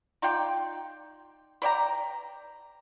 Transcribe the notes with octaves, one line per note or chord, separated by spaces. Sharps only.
D#4 F4 D5 G5
B4 D5 G5 A#5